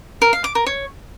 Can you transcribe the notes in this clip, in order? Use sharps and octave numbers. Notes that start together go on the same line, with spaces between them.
A#4
F5
D6
A#4
C#5